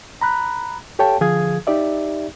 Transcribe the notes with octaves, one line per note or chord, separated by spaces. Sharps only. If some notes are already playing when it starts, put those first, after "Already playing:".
A#5 B5 F#6
G4 A4 C#5 F5 G5 A5
D3 F3 G#4 F5 D#6 G#6
D#4 G4 D5 E5